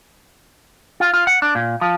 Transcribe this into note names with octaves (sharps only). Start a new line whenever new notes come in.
F4
F4
F#5
D4
A#2
F3